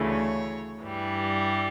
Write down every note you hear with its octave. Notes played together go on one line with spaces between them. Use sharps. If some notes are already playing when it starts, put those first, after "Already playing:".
Already playing: D2 C#3 E3 A3
C#5
G2 E3 G3